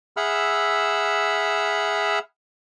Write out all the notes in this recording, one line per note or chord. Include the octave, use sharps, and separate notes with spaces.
G#4 E5 F#5 B5 E6 F6